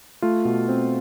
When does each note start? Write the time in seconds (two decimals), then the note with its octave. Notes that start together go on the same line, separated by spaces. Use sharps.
0.22 A3 F4
0.45 B2
0.69 C4